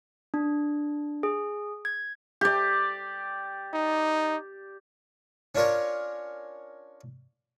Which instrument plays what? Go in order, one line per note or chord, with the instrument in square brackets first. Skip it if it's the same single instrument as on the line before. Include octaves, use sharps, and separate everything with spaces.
[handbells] D4
G#4
G#6
[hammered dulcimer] G4 D5
[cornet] D#4
[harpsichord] C#4 D4 F4 A#4 C#5